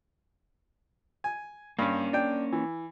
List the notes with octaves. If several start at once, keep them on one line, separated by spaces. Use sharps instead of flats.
G#5
G2 A#3 C#4
D4 G5
E3